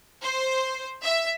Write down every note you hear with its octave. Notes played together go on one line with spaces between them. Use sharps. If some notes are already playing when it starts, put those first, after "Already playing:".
C5
E5